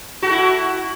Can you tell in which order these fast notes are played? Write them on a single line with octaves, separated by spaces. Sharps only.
F#4 A4 E4